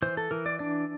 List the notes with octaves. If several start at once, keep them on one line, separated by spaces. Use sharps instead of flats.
E3 C5
A4
E3 A#4
D5
D4 D5